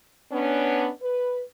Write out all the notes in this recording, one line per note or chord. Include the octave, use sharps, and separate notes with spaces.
B3 C#4 D4
B4